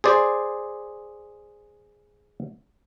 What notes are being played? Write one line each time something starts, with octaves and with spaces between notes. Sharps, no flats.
G#4 C5 D5